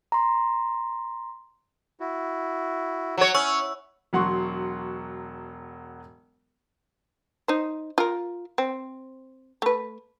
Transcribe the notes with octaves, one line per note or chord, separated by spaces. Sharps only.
A#5 C6
E4 F#4
F#3 C#5
C#4 E4 C#6 E6
E1 F#3 F#5 C6 C#6
D#4 C5
F4 A#4
C4
A3 B4